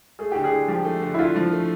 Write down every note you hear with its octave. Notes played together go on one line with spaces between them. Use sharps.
A3 G#4
D3 G4
G#4
D3
F3 G4
A3
D3
E4
D3 F4
F3
A3